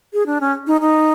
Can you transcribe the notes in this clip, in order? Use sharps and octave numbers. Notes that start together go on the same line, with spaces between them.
G#4
D4
C#4
D#4
D#4